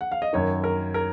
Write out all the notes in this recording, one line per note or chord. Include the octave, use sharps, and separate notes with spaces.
F#5
F5
D#5
F#2 D#3 C#5
A#4
A#4